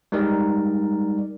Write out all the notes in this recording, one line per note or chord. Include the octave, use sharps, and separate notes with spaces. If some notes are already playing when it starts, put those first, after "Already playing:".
G3 G#3 D#4 A#4 D5